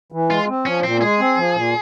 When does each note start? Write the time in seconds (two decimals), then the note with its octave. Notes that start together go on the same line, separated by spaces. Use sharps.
0.12 E3
0.29 G#3 F4
0.48 C4
0.65 F3 C#4
0.84 A#2 C4
1.01 G#3 G#4
1.20 C4
1.37 F3
1.55 A#2